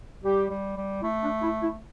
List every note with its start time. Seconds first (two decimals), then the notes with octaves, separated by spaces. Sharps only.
0.24 G3 G4
0.50 G3
0.77 G3
1.02 A3 E4
1.23 D4
1.42 E4
1.62 E4